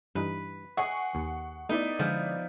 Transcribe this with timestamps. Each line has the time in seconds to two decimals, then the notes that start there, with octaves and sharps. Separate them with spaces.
0.15 G2 E3 D#4 B4
0.77 G#4 C#5 D#5 E5 F#5 C#6
1.15 D#2
1.69 A3 B3 D#4 E4 D5
1.99 D3 F3 G#3